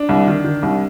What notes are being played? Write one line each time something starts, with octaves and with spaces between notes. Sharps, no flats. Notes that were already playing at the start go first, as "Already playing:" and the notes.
Already playing: D4
C2
D#3
D#3
C2